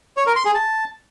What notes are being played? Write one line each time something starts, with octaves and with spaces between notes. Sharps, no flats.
C#5
A#4
C6
G#4
A5